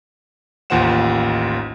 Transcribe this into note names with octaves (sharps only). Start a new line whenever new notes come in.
A1 D#2 F4 C5 F#5 E7